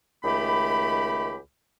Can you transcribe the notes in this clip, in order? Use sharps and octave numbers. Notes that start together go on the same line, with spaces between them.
C#2 D#3 A3 G4 B5